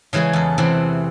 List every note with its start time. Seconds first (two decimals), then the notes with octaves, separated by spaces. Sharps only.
0.13 C#3 E3 G#3 C#4 G#4
0.33 E2 A4
0.58 E2 C3 E3 C4